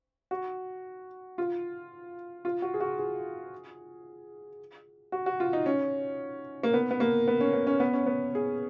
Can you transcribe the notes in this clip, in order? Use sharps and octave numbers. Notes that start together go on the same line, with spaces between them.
F#4
F4
F4
F#4
G#4
F#4
G#4
F#4
F#4
F4
D#4
C#4
A#3
B3
B3
A#3
B3
C#4
B3
C#4
B3
C#4
B3
G#4